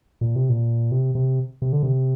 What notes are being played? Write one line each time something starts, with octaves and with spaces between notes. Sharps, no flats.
A#2
C3
A#2
C3
C3
C3
D3
C3